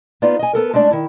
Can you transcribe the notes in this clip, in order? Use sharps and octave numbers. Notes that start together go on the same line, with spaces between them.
A#3 B3 D#4 F4 D5 F5
D#5 G#5
B3 A4 A#4
G#3 A3 D4 D5
D#3 E4